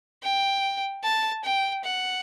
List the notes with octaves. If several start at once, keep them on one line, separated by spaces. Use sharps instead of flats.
G5
A5
G5
F#5